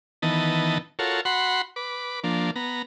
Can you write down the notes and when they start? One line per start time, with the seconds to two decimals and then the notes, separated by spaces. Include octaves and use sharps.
0.22 D#3 E3 B3 D#5 A5
0.99 F4 F#4 A4 A#4 C#5
1.25 F#4 F#5 B5 C6
1.76 B4 D6
2.24 F3 A#3 D4
2.56 B3 A#5